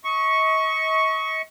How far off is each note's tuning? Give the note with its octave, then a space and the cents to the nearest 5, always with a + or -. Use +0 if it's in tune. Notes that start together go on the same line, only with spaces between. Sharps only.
D#5 +40 C#6 +0